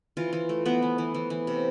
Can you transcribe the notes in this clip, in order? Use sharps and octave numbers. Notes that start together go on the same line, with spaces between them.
E3 F4
E3
A3
E3 B3
E3
E3
E3
E3
C3